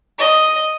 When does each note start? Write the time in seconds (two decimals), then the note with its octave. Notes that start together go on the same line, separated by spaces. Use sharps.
0.19 D#5